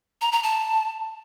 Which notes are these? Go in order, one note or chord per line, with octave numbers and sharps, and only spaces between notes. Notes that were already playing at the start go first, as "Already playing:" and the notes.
A#5
A#5
A5